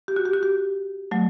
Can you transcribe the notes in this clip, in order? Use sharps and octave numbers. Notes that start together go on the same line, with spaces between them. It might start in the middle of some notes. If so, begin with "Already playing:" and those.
G4
F#4
G4
F#4
G4
F#3 A3